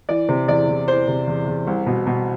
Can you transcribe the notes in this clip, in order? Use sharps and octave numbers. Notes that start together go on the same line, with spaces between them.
E3 D5
C3
E2 D5
E2
E3 C5
C3
E2
E2
C2
B2
B2